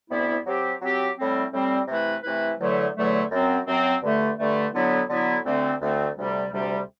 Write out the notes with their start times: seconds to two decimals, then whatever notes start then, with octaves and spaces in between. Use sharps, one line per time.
0.09 D2 C3 G3 B3 E4
0.45 F#3 C4 G4
0.81 F#3 C4 G4
1.16 A2 G3 C4
1.52 A2 G3 C4
1.87 C3 E3 A3 E4 B4
2.23 C3 E3 A3 E4 B4
2.59 E2 D3 F#3 A3
2.95 E2 D3 F#3 A3
3.31 F#2 F#3 C4
3.67 F#2 F#3 C4
4.02 G2 D3 A3
4.38 G2 D3 A3
4.73 D3 F#3 B3 E4
5.09 D3 F#3 B3 E4
5.44 D2 D3 A3 C4
5.80 D2 D3 A3 C4
6.16 D2 C3 G3
6.52 D2 C3 G3